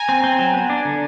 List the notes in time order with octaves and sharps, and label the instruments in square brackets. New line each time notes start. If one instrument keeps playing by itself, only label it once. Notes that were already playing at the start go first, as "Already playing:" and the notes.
Already playing: [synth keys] G#5 A#5
[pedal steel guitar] C4
C4
F#3
B3
D4
D3